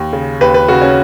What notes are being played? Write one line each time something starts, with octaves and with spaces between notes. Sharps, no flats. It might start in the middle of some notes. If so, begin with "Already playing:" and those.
Already playing: D#2
C#3
D#2 B4
B4
C#3 F#4
C#4